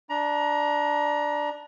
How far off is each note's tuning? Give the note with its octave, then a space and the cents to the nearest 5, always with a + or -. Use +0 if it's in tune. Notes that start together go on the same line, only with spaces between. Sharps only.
D4 +0 A#5 +25